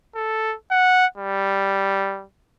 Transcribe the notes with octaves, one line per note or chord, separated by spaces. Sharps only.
A4
F#5
G3